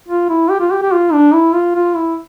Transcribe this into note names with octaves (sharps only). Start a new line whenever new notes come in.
F4
E4
G4
F4
G4
G4
F4
D4
E4
F4
F4
E4